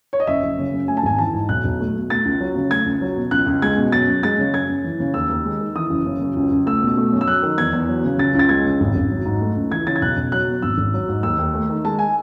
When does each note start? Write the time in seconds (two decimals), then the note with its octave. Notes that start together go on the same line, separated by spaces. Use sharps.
0.13 C#5
0.20 D#5
0.27 F#1 E5
0.43 F#1
0.58 C#3
0.73 F#2
0.88 A3 G#5
0.97 A5
1.03 G#1 G#5
1.18 E3 A5
1.34 G#2
1.49 B1 F#6
1.64 B1
1.80 A3
1.95 B2
2.10 A3 A6
2.25 C#2
2.40 F#3
2.56 C#3
2.71 A3 G#6
2.86 C#2
3.02 F#3
3.16 B2
3.31 C#2 F#6
3.46 C#2
3.62 G#3 G#6
3.77 B2
3.92 F#2 A6
4.08 F#2
4.23 G#3 A6
4.38 C#3
4.53 F#2 G#6
4.69 F#2
4.84 E3
5.00 C#3
5.14 D#2 E6
5.30 D#2
5.45 G#3
5.60 D#3
5.75 E3 D#6
5.90 F#1
6.06 C#3
6.21 F#2
6.36 C#2
6.51 C#2
6.66 A3 E6
6.83 B2
6.97 A3
7.12 F#2
7.21 E6
7.27 F#3 F#6
7.43 D#3
7.58 E2 G#6
7.73 E2
7.89 F#3
8.04 C#3
8.18 C#2 A6
8.35 C#2 A6
8.49 G#3 G#6
8.65 C#3
8.80 G#1
8.95 G#1
9.11 F#3
9.25 G#2
9.41 A3
9.56 C#2
9.71 E3 G#6
9.87 C#3 A6
9.96 G#6
10.02 B1 F#6
10.17 B1
10.32 F#3 F#6
10.47 B2
10.62 G#1 E6
10.78 G#1
10.94 F#3
11.08 G#2
11.23 D#2 E6
11.39 D#2
11.54 A3
11.70 D#3
11.84 G#3 A5
11.99 G#5